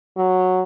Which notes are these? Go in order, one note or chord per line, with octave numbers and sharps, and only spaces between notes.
F#3